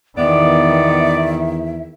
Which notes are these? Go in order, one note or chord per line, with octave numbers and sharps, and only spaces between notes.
E2 D#3 B3 D5 E5